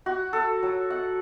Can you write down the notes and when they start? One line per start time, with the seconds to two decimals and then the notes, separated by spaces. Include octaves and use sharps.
0.06 F#4
0.33 A4
0.63 F#3
0.90 F#5